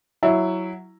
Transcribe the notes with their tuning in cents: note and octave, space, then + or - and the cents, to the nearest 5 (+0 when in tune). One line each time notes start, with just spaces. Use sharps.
F#3 +0 E4 +0